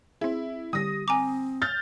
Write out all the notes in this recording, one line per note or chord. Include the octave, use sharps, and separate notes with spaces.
C4 E4 G#4
D3 G3 G4 D#6 A#6
C4 G#5 A#5 D6
F6 G6 A6